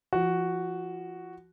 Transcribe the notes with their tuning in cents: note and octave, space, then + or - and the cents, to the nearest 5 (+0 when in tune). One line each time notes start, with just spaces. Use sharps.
F3 -30 F#4 +0